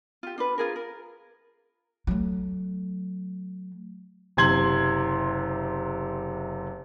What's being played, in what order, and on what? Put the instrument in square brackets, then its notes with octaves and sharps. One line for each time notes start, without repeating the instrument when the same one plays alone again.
[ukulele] F4 G4
D4 F4 B4
F4 G#4 A#4
A#4
[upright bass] F#3 A3
[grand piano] F#1 C3 C6 G#6 F#7